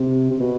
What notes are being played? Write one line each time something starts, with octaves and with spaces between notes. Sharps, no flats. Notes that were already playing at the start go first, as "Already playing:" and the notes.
Already playing: C3
C3
B2